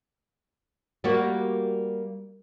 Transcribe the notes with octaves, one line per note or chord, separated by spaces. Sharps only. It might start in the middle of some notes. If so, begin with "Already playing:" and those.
G3 A#3 F#4